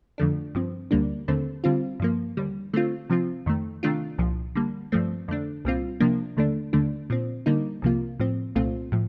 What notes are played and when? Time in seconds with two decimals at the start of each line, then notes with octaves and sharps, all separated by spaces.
0.18 F2 D3 F3 A3 D4
0.55 G2 F3 C4
0.91 D2 D3 G3 A#3 D4
1.28 D#2 D3 A3 C4
1.64 D3 G3 C4 F4
2.00 G2 F3 A#3
2.37 D#2 D3 G3
2.73 D3 A3 C4 F4
3.10 C3 F3 C4 F4
3.46 F2 D#3 A3
3.83 C3 D#3 A3 D4 F4
4.18 C2 A#2 F3
4.55 D3 G3 A#3
4.92 G2 F3 A3 C4
5.28 F2 D3 A3 D4
5.65 C2 A#2 G3 C4 F4
6.00 C3 F3 A#3 D4
6.37 D#2 D3 A3 D4
6.73 D#2 D3 A3 D4
7.10 A#2 F3 C4
7.46 D3 G3 A#3 D#4
7.82 C2 C3 F3 A#3 F4
8.20 A2 F3 C4
8.55 C2 A#2 A3 C4 F4
8.92 A2 F3